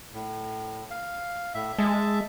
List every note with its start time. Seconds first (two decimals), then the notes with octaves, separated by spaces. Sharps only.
0.14 A2
0.91 F5
1.54 A2 E5
1.79 G#3 E5 A5